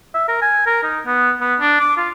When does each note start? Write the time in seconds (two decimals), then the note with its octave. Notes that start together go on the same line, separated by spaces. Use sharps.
0.14 E5
0.28 A#4
0.42 G#5
0.66 A#4
0.83 D#4
1.06 B3
1.41 B3
1.60 D4
1.80 D6
1.97 F4